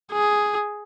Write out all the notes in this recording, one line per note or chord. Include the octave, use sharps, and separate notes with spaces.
G#4